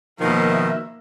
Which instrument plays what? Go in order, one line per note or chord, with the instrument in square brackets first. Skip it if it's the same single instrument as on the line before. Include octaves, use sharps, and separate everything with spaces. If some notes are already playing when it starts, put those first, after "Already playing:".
[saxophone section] B2 D#3 F3 [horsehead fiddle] A#3 E5